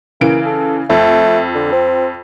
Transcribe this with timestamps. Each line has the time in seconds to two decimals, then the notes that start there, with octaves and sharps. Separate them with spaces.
0.21 C#3 E3 A#3 D7
0.46 A4
0.90 F2 A3
1.55 D3
1.72 C4